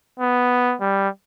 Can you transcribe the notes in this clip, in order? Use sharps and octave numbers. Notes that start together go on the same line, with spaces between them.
B3
G3